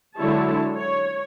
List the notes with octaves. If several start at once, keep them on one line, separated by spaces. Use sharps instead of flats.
D3 F#3 G#3 E4 C#5 A5
C#5